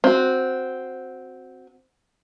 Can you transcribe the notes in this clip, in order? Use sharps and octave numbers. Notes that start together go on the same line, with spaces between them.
C4 F#4